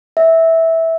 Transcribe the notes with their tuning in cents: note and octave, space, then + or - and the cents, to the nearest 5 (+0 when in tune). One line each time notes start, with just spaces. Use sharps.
E5 -15